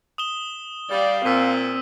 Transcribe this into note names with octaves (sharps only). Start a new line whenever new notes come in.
D#6 E7 G7
G3 D5 F5
A#2 C4 E6 B6 D#7